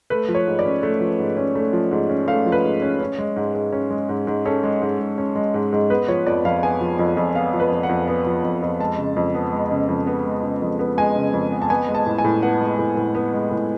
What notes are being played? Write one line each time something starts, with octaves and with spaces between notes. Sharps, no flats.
A3 B4
F3
C#5
G#2
D5
C#4
A3
F3
G#2
C#4
A3
F3
G#2
C#4
A3 F5
F3
B4
G#2
C#4
C#4
G#3
G#2
G#2
C#4
G#3
G#2
G#2
C#4 A4
G#3
G#2
G#2
C#4
G#3
G#2
G#2
B3 B4
F3 C#5
F2 D5
F2 F5
B3 G#5
F3
F2
F2
B3 F5
F3
B4
F2
F#5
F2
B3
F3
F2
F2
G#3 A5
C#3
F2
B3
G#3
C#3
F2
B3
G#3
C#3
F2
B3
G#3 G#5
C#3
F2
B3
A5
B3 G#5
G#3
A5
A2
G#5
A2
B3 F#5
G#3
A2
A2
B3
G#3
A2